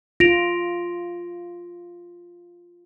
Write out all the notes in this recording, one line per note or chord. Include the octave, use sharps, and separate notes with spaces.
F4 A#6 D7 F7